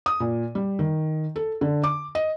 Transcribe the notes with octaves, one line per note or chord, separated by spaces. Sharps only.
D#6
A#2
G3
D#3
A4
D3
D6
D#5